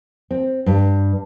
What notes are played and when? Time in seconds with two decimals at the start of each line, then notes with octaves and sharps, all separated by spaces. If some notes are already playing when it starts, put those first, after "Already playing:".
0.31 C4
0.66 G2